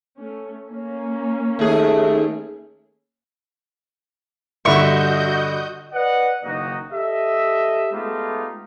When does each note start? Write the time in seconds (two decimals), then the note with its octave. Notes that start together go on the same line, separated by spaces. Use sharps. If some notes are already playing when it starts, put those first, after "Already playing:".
0.17 A3 C#4
0.68 A#3 C#4
1.59 D#2 A3 G#4
4.65 G2 D3 F#4 D#5 E5 C#6 G6
5.93 B4 D5 D#5 F#5
6.43 F#1 D#3 A#3 D#4 F#4 D#5
6.91 G4 A4 D#5 E5
7.92 G#3 A3 B3 D#4 F4 G4